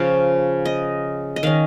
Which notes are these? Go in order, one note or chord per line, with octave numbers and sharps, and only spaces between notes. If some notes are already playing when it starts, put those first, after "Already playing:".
Already playing: C#3 F3 C#4 F5
D#5
D#5
D#3 C#4 F5